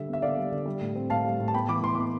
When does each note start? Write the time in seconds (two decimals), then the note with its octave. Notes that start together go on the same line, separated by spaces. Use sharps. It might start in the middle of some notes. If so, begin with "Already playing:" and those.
Already playing: D3 G3 E5
0.08 B3
0.13 E5
0.22 D3 D5 F5
0.37 G3
0.52 D3
0.66 G3
0.81 A2
0.95 C4
1.10 A2 F5 A5
1.25 G3
1.40 A2
1.48 A5
1.54 B3 G5 B5
1.68 E3 B5 D6
1.83 E3 C6
1.95 B3 D6